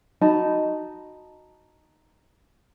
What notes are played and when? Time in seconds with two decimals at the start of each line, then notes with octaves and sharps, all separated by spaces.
0.21 D#4 F#4 A5 B5